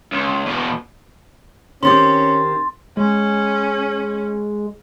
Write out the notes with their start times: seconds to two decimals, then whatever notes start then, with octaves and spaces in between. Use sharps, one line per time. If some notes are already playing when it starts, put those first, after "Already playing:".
0.12 C#2
0.46 E2 B2
1.83 D#3 C4 C#4 G4 C6 A6
2.97 G#3 C#4